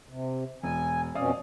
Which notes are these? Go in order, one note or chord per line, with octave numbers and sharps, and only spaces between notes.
C3
E1 G#5
F2 B2 C#4 D5 F5 D#6